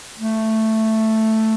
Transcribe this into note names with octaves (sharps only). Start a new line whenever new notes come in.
A3